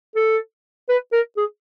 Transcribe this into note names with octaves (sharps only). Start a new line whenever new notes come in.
A4
B4
A#4
G#4